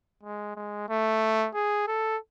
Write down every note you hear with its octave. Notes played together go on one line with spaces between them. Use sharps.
G#3
G#3
A3
G#4
A4